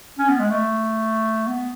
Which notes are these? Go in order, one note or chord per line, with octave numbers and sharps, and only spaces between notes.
C#4
B3
G#3
A3
B3